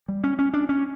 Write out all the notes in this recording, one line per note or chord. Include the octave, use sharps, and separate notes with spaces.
G3
C#4
C#4
D4
C#4